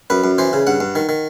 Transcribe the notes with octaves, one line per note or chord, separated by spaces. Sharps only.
F#2 B4
F#2
E3 C5
C#3
G2 F#5
G2
D#3
D#3